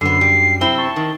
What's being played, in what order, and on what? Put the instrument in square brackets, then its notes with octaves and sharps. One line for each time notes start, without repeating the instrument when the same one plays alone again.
[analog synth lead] F#2 [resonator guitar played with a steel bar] D3 B3 [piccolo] C7
[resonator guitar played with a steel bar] G3
[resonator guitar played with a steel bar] C3 C4 E4 [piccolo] G7
[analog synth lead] A5 [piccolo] C#6
[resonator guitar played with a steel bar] D#3